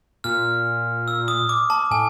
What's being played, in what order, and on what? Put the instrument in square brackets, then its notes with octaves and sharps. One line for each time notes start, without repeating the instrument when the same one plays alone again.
[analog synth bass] A#2 [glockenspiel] F6
[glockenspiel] E6
D#6
D6
A5
[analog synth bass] A2 [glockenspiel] G#5